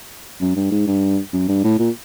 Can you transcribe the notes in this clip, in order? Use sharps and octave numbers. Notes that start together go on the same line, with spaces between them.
F#2
G2
G#2
G2
F#2
G2
A2
A#2